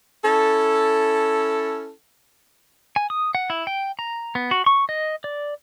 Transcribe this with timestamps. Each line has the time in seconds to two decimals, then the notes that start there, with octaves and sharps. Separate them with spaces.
0.25 C#4 E4 A4
2.96 G#5
3.10 D#6
3.35 F#5
3.50 E4
3.67 G5
3.99 A#5
4.35 B3
4.51 F#4
4.66 C#6
4.89 D#5
5.24 D5